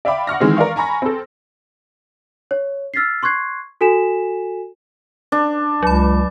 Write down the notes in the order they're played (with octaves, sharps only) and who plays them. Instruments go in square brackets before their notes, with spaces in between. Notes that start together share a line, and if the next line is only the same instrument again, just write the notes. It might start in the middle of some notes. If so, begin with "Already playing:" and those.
[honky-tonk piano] D5 E5 F5 G5 B5 D6
F#5 C#6 F6 A#6
D#3 E3 G#3 C4
A#4 D5 F5 C#6
G#5 A#5 B5 C#6 A#6
C4 A4
[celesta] C#5
E6 F6 A6 B6 C7
C6 C#6 F#6 G#6 C7
F#4 A4 G#5 B6 E7
[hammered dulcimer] D4
[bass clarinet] C#2 [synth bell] F#3 B5